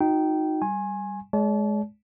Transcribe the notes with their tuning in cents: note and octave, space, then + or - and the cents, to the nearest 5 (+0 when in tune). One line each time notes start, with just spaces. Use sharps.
D#4 +0 F#4 -35 G5 -15
G3 +0 G#5 +0 C6 +40
G#3 +20 D5 -45 A5 -35